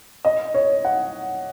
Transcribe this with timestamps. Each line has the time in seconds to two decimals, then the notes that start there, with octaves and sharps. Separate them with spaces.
0.25 D#5
0.54 C#5
0.84 F#5